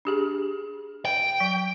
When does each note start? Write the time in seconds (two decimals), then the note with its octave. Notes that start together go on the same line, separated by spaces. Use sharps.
0.05 D4 G4 G#4
1.05 G5
1.40 F#3